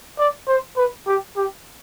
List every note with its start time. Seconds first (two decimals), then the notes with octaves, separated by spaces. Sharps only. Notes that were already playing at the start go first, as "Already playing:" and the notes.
0.19 D5
0.48 C5
0.77 B4
1.07 G4
1.36 G4